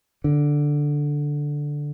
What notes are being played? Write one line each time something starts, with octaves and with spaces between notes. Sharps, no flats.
D3